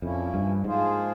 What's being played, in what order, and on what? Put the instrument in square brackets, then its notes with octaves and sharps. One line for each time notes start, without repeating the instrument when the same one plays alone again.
[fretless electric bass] F2 [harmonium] A#2 F3 A#3 C#4 E4
[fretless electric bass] G2
[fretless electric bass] G#2 [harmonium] F3 A#3 F4 G#4 C5